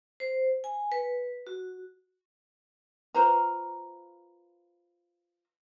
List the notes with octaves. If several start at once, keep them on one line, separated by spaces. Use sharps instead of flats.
C5
G#5
B4
F#4
F4 B4 C5 A#5